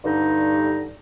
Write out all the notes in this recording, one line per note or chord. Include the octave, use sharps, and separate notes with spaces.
G2 D3 D#4